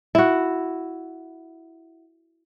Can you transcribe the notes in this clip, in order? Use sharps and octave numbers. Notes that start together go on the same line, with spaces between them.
E4 F#4